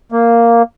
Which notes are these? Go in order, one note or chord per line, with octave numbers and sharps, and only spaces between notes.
A#3